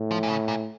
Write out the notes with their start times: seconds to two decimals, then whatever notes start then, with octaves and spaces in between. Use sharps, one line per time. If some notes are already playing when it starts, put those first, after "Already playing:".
Already playing: A2
0.11 F3
0.23 A#2
0.29 C#3
0.48 A#2